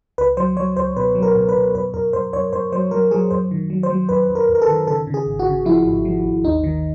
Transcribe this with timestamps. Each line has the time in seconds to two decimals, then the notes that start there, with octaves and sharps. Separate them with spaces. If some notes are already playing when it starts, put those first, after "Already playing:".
0.18 C#2 B4
0.37 F#3 C5
0.57 F#3 C#5
0.76 C#2 C5
0.96 B2 B4
1.15 F#3
1.23 A#4
1.35 B2
1.49 B4
1.55 B2
1.75 F#2 B4
1.93 F#2 A#4
2.13 F#2 C5
2.33 F#2 C#5
2.53 F#2 C5
2.72 F#3 C5
2.91 F#3 A#4
3.11 F#3 G#4
3.31 F#2 C5
3.51 D#3
3.70 F#3
3.83 C5
3.90 F#3
4.09 F#2 B4
4.29 F#2
4.35 A#4
4.48 F#2
4.55 A#4
4.62 A4
4.68 D#3
4.87 C#3 A4
5.07 C#3
5.14 G#4
5.26 G#1
5.39 F#4
5.46 C#3
5.65 F3 E4
5.85 G#1
6.05 F3
6.25 G#1
6.44 D#2 D#4
6.64 D#3